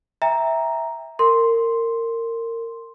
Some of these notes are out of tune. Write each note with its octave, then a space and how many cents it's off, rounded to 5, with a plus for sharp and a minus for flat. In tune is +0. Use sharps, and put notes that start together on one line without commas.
E5 -10 G5 +35 A#5 +0
A#4 -25 C6 +0